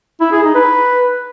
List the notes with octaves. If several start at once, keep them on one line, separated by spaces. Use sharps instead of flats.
E4
G#4
D#4
B4